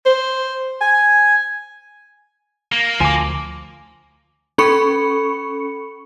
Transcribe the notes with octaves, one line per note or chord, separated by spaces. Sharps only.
C5
G#5
A#3
D2 F3 G#5 D6
C#4 A4 B5 C#6 C#7